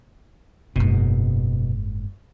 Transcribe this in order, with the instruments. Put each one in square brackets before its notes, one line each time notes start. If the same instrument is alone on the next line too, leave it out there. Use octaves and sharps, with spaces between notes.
[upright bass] F#1 G#2 [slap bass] B2